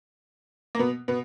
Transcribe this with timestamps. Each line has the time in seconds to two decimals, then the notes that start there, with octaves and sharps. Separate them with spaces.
0.75 A#3
0.79 B2 B3
1.08 B2 B3